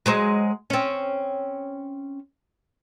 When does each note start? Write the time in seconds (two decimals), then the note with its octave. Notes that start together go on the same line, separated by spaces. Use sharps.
0.06 F#3 G#3 C5
0.70 C4 C#4